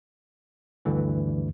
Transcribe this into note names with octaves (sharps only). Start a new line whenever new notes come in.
D2 G2 D3 E3